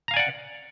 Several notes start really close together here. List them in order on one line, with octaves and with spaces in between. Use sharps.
A#5 F5 G#5 D5 F#5